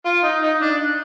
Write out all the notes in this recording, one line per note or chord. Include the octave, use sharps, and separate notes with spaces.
F4
D#4
D#4
D4